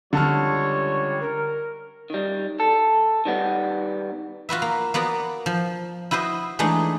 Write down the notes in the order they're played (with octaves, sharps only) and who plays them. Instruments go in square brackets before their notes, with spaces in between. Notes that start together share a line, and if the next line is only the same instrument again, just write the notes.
[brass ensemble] C#2 G3 C#5 [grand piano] D3 A5 F6
[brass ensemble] A#4
[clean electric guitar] D#3 G3
A4
D#3 G3 B3
[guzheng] F4 F#4 B4 E5
A#3
A#3 B3 F#4 D5
F3
E4 F#4 B4 C5 D#5
E3 G#3 A3 D4 D#4